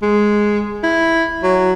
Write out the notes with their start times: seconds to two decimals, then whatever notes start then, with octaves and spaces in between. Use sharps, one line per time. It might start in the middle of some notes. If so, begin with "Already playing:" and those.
0.02 G#3
0.83 E4
1.43 F#3